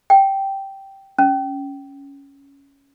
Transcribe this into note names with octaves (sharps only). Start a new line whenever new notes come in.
G5
C#4